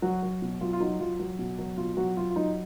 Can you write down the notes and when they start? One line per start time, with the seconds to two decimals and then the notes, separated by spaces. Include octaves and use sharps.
0.02 F#3 F#4
0.23 F#3
0.42 B2
0.61 F#3 F4
0.73 F4
0.80 F#3 D#4
1.00 F#3 F4
1.20 F#3
1.39 B2
1.59 F#3
1.77 B2 F4
1.97 F#3 F#4
2.17 F#3 F4
2.30 F4
2.36 F#3 D#4